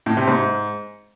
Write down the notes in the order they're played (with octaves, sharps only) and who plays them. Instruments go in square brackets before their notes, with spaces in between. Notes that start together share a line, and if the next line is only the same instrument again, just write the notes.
[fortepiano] A2
C3
G#2